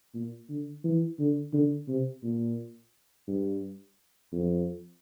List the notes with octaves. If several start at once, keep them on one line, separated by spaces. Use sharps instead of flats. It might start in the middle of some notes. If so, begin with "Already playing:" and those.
A#2
D3
E3
D3
D3
C3
A#2
G2
F2